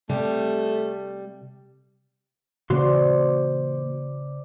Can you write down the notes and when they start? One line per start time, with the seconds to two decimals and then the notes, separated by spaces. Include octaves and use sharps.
0.09 C3 G3 A3
2.70 A#2 C#3 E3 A#3 F#4 C5 D5 C6